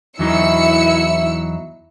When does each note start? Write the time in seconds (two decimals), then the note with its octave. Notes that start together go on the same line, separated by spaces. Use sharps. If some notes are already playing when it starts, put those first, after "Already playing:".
0.19 E2 F#3 D#4 E4 E6 C#7